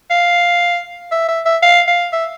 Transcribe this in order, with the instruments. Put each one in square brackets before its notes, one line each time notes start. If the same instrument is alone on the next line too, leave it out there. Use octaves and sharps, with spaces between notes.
[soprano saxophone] F5
E5
E5
E5
F5
F5
E5